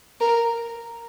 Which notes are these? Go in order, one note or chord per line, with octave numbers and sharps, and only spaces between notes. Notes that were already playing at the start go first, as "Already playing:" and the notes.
A#4